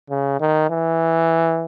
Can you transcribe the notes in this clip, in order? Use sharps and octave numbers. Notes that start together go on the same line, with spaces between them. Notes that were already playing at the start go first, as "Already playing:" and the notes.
C#3
D#3
E3